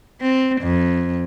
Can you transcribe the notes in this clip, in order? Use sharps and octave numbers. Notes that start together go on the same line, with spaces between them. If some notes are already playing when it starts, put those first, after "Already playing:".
C4
F2